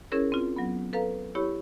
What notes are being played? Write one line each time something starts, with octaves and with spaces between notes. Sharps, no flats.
C#4 E4 G#4 A#4 C#5
C4 F4
F#3 B3
A4 B4 F5 A#5
E4 G4 C#5 B5 C#6